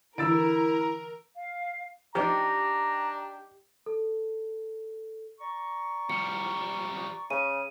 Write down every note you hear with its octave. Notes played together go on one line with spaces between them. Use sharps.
D3 E3 E4 A#4 E6 A6 D7
F5
F3 D4 D#4 G4 A#5
A4
D5 A#5 C#6
F3 G3 C#7
C#3 D#7